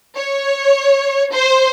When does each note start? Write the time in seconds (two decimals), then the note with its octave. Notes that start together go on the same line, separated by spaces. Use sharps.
0.16 C#5
1.33 C5